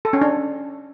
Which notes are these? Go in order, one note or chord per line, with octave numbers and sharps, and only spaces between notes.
A4
C#4
D4